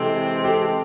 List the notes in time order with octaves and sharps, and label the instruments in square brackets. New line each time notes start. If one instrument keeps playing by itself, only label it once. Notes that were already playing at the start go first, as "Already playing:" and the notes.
Already playing: [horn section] C3 E3 G#3 C4 [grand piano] G4 A4
[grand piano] G4 A4